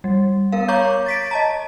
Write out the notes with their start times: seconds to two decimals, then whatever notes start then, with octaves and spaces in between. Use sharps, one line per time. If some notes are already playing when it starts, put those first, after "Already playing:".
0.04 G3
0.52 B3 A#4 F5
0.68 C#5 A#5 C#6 D6 G6
1.06 A6 B6 D7
1.31 D#5 A5 A#5